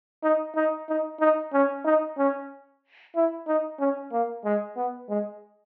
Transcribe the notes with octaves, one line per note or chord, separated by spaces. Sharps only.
D#4
D#4
D#4
D#4
C#4
D#4
C#4
E4
D#4
C#4
A#3
G#3
B3
G#3